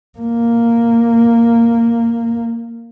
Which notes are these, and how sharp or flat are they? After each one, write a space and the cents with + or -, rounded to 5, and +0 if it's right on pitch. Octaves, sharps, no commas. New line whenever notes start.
A#3 -5